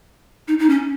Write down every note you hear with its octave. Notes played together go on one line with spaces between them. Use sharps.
D#4
D#4
C#4